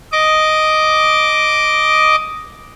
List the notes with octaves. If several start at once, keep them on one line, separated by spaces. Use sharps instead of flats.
D#5 D6